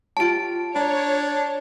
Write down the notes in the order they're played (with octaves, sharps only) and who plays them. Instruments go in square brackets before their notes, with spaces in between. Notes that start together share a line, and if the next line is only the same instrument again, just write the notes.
[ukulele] F4 G4 C#5 [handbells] A5 D7
[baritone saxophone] D4 [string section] C#5 [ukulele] A#5